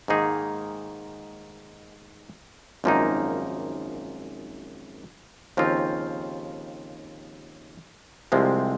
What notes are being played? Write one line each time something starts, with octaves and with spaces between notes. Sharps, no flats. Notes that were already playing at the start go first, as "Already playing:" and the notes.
G#2 D#3 A#3 D#4 G#4
G#1 F#2 F3 A#3 D#4
D#2 C#3 F3 C4 F4
C2 C3 F3 G#3 C4